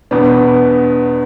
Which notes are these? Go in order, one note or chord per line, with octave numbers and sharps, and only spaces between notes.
E2 B2 B3 D4